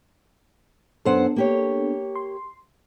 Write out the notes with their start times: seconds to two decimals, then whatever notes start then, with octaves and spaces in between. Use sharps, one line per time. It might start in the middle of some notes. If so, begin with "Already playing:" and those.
1.05 F#2 B3 D4 A4 C5 F#5
1.36 A#3 G4 C#5
2.16 C6